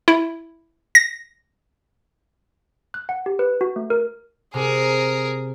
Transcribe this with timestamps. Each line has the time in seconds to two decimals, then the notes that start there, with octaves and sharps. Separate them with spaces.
0.08 E4
0.95 A#6
2.94 F#6
3.09 F#5
3.26 G4
3.39 B4
3.61 F#4
3.76 A3
3.90 A#4
4.54 C3 G#4 A#4